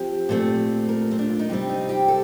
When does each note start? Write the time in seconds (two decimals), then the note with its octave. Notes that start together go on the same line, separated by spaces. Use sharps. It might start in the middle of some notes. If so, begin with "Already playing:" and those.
Already playing: F3 C4 G4
0.29 A#2 A3 C4
0.89 A#4
1.11 C4
1.19 D4
1.30 F4
1.39 D#4
1.49 C3 G3 C4 D4
1.69 D#4
1.89 G4
2.08 A4